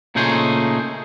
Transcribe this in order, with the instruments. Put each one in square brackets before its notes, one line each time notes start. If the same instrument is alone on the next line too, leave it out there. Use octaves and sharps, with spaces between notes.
[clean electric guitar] A#2 C#3 A3 D#4 G#4 C5